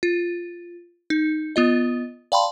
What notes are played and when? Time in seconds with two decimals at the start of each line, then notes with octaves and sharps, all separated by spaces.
0.03 F4
1.10 D#4
1.56 B3 F4 D#5
2.32 D5 F5 G5 A5 B5 C6